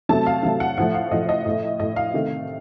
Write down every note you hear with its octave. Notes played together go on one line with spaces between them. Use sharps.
C3 F#3 A3 A5
F5
C3 F#3 A3 F5
F#5
A2 F3 A3 F#5
F5
A2 F3 A3 D#5
D#5
A2 A3
A2 A3 D#5
F5
C3 D#3 A3